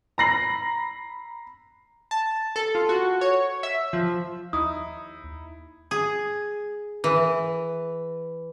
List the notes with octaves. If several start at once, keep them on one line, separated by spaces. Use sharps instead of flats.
A#5 B5 A#6 C7 F#7
A5
A4
F4
F#4
C#5
E5
F3
D#2 D#4 E4 D#6
G#4
E3